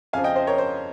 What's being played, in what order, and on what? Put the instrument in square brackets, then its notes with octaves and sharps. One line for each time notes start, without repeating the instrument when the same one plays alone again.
[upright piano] F2 C#3 F3 F5 G#5
D#5 G5
C5 D#5
A#4 C#5
C5